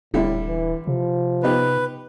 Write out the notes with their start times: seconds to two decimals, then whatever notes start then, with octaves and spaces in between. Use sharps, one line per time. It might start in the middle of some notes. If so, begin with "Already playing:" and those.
0.14 D#1 A2 D3 G3 E4
0.48 E3
0.88 C3 F3
1.43 B3 D#4 G4 B4